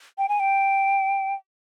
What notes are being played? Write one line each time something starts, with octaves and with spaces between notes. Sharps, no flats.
G5
G#5
G5